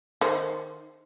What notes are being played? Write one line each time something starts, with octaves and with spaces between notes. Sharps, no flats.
D#3 C5